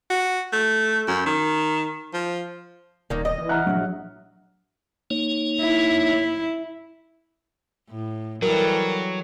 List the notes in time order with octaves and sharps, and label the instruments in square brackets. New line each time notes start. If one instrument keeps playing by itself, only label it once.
[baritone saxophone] F#4
A3
F#2
D#3
F3
[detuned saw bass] D#1 [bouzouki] D#3 A#3 [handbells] D5
[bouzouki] D#5
[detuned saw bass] E3
[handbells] E5 F#5 F6 [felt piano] A#5 F#6
[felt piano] A#1 [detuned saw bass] F#3
[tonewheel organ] A#3 D#4 C#5
[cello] E4
[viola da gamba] A2
[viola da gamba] E3 G3 A4 [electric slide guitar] F#3 [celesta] A#4